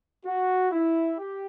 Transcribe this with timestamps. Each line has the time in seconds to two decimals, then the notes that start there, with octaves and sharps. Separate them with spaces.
0.26 F#4
0.72 E4
1.18 G4